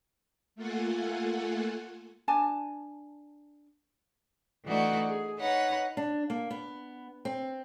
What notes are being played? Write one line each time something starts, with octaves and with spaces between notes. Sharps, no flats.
A3 A#3 F4 A4 F#5 G#5
D4 G#5 A5
E3 A3 D4 D#4 F#4 D5
G#4
D#4 B4 C#5 F#5
D4
A#3
B3
C4